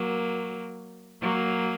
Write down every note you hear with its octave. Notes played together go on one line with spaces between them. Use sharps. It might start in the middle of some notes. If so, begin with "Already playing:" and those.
Already playing: F#3 A#3
F#3 A#3